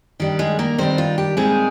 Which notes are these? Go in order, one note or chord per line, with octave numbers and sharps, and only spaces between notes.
D#3 G3 D4 G4
G#3 G#4
A#3 A#4
D#3 G3 C4 D4 C5
F4
G4
A#2 G3 G#3 C4 D#4 G#4